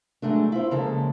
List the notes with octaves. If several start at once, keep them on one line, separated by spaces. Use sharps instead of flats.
F#3 G#3 A3 D4
E4 F4 C5
C#3 F3 G#3 A#3 A4